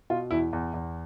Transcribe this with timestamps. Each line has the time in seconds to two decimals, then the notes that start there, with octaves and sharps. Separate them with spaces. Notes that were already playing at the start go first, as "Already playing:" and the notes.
0.10 B2 F4
0.31 E2 E4
0.53 E2
0.74 E2